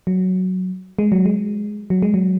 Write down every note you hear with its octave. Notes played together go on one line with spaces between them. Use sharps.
F#3
G#3
F#3
G#3
F#3
G#3
F#3